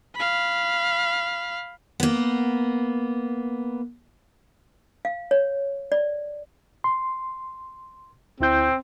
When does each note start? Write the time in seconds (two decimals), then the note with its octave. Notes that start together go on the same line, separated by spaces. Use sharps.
0.15 F5 B5
2.00 A#3 B3
5.05 F5
5.31 C#5
5.92 D5
6.84 C6
8.40 D2 C4 E4 G6